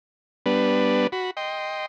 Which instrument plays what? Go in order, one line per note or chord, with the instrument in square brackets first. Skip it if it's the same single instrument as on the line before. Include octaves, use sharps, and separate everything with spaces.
[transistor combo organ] G3 B3 D4 B4
F#4 B5
D#5 G5 C6